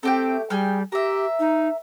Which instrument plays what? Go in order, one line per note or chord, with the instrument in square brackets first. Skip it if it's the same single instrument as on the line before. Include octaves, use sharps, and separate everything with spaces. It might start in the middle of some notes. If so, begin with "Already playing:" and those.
[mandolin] A3 G4 G5 [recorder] C4
[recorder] G3 [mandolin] G#4 G5 F6
[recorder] G4 [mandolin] A#4 E5
[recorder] D#4